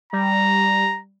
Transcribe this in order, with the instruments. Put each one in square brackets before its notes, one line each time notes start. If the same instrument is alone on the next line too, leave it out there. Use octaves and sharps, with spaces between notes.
[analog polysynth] G3 [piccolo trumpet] A#5